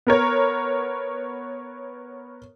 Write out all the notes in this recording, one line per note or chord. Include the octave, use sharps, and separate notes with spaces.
B3 A#4 C#5